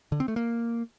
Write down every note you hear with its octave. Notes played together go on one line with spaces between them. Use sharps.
D3
C4
A3
A#3